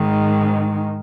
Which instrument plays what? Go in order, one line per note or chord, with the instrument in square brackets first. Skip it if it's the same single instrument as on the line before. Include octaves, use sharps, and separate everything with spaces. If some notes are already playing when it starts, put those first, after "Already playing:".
Already playing: [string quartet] G#2 D#3 G#3